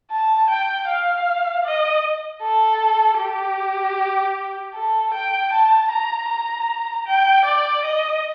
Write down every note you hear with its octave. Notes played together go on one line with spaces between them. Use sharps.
A5
G5
F5
D#5
A4
G4
A4
G5
A5
A#5
A#5
G5
D5
D#5